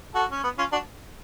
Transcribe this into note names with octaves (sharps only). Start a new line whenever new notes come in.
F#4 A4
C#4
B3
C#4 F4
D4 F#4